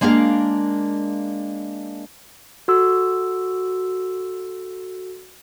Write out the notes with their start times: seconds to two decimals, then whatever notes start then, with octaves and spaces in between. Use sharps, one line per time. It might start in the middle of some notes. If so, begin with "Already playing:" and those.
0.01 G#3 A#3 D4 A#4 F5
2.68 F#4 A4 C6 E6